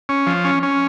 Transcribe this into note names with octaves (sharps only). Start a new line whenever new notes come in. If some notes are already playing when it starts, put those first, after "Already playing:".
C#4
F3
C#4
C#4